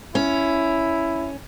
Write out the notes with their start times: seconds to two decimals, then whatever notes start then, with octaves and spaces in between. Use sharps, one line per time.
0.15 C#4 E4